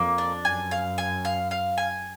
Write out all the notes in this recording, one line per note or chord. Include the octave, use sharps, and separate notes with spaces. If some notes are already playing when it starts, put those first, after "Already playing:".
Already playing: F2 A#3
D4
F#2 G#5
F5
G#5
F5
F5
G#5